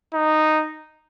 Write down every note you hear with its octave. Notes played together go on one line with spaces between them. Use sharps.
D#4